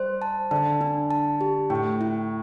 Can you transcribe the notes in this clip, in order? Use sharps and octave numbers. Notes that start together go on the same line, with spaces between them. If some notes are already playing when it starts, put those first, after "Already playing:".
Already playing: G3 C5
A5
D3 A5
D4
A5
G4
A2 G5
E4